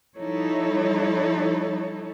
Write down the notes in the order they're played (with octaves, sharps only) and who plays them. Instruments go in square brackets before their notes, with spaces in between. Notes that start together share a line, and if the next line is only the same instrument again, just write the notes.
[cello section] F3 G3 D#4 E4 A4 C#5